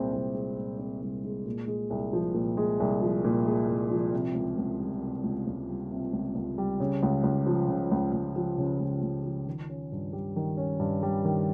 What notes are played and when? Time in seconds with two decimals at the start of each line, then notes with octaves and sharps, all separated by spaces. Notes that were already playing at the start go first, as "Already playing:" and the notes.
Already playing: C2 A#2 G#3 C4
0.13 C2
0.34 G#3
0.57 A#2
0.79 C4
1.01 C2
1.24 G#3
1.46 A#2
1.68 G#3
1.90 C2
2.13 F3
2.34 A#2
2.57 G#3
2.80 C2
3.01 F3
3.24 A#2
3.46 G#3
3.68 C2
3.91 F3
4.13 C3
4.35 C#2
4.58 C#2
4.80 G3
5.01 C3
5.24 C#2
5.47 C#2
5.69 G3
5.91 C3
6.13 C#2
6.35 C#2
6.58 G3
6.80 C#3
7.03 C#2
7.24 C#2
7.47 F3
7.68 C#3
7.91 C#2
8.13 C#2
8.36 F3
8.58 C#3
8.80 C#2
9.03 C#2
9.24 F3
9.47 D#3
9.70 C#4
9.92 G2
10.13 G3
10.36 D#3
10.57 C#4
10.80 G2
11.03 G3
11.25 D#3